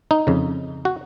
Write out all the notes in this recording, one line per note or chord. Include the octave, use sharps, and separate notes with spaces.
D#4
F2 C#3
F#4